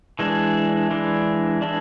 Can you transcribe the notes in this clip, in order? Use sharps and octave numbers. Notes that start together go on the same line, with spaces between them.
E3 G#3 D4
E3 G#3 D4
E3 G#3 D4